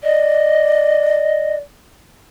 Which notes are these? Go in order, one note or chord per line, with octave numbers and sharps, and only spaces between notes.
D5 D#5